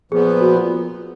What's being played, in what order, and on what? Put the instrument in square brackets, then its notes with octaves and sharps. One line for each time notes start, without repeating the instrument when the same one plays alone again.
[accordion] A#2 F3 B3 [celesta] G#4
[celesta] F#4
F4